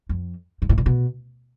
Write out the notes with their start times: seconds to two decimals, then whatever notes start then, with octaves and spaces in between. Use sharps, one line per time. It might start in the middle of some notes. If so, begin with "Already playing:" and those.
0.09 F2
0.62 G#2
0.69 A2
0.78 A#2
0.86 B2